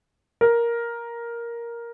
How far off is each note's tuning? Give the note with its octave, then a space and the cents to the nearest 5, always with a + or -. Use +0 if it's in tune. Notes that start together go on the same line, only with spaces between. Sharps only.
A#4 +5